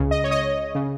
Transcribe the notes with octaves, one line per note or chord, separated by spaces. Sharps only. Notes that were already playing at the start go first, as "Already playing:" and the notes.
Already playing: C#2 C#3
D#5
C#5
D#5
C#3